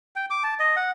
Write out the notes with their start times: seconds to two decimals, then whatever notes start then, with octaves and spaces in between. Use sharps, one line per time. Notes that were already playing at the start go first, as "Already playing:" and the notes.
0.16 G5
0.30 D6
0.43 A5
0.59 D#5
0.76 F#5